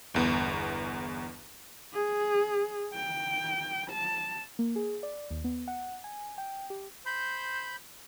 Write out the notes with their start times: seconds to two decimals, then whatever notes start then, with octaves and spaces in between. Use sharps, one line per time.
0.14 G1 E2 B3
1.94 G#4
2.95 G5
3.91 A5
4.59 A#3
4.76 G#4
5.03 D5
5.30 D#2
5.44 B3
5.68 F#5
6.04 G#5
6.38 G5
6.70 G4
7.06 C5 B5 G6